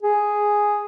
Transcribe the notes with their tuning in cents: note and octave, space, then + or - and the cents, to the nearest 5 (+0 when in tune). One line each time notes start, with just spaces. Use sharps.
G#4 +0